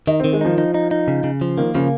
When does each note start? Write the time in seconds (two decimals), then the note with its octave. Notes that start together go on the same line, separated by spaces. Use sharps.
0.07 D#3 D#4
0.20 C4
0.24 D#3
0.33 G#3
0.41 F3 D#4
0.58 D#4
0.74 D#4
0.91 D#4
1.08 C#3
1.24 C#3
1.41 F3
1.58 D#3 A#3
1.75 C#3 F3